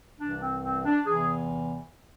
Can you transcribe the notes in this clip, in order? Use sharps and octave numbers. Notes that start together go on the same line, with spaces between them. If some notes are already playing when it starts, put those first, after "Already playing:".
C2 C3 E3 D4
C4
C4
D4
E2 C3 E3 G#4